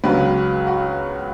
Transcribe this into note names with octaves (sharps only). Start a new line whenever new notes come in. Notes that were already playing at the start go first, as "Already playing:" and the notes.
C#2 C#3 F#3 B4
F#4